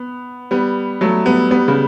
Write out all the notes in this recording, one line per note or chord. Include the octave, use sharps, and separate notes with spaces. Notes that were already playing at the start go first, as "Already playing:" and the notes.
Already playing: B3
G3 B3
F#3 A3
G3 B3
G3 B3
C#3